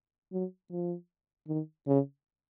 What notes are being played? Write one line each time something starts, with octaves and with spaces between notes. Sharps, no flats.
F#3
F3
D#3
C#3